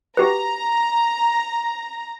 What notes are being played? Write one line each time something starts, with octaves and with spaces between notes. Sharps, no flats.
F#4 G4 B4 A#5